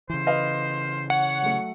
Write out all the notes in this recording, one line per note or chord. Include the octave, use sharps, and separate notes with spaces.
C#3 E3 C5
B4 D#5 F5
C#5 F#5
F#3 A3